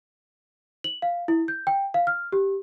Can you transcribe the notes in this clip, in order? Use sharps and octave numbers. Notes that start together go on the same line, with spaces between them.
F#7
F5
E4
G6
G5
F5
F6
G4